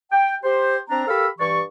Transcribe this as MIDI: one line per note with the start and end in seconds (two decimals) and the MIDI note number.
0.12 0.35 79
0.44 0.77 67
0.44 0.77 72
0.90 1.04 60
0.90 1.04 62
0.90 1.04 82
1.08 1.27 67
1.08 1.27 69
1.08 1.27 70
1.08 1.27 77
1.08 1.27 83
1.08 1.27 88
1.39 1.61 43
1.39 1.61 52
1.39 1.61 67
1.39 1.61 74
1.39 1.61 85